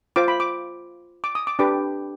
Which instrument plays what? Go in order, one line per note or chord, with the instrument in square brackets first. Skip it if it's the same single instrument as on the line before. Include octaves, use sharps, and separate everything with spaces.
[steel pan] F4 C5 D6
B5
D6
D6
D#6
D6
D4 G4 B4 D6